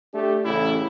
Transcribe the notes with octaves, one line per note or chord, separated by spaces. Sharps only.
A3 D4 G4
A1 A2 C#3 E4